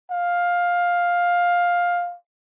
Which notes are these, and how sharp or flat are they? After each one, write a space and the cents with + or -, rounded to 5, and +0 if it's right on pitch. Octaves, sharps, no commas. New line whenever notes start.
F5 +10